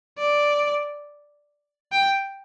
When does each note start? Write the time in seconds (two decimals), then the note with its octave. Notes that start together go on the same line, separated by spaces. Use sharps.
0.18 D5
1.92 G5